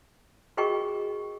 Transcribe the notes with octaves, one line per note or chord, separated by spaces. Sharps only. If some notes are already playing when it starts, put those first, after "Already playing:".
F#4 G#4 A#4 D#5 G5 C#6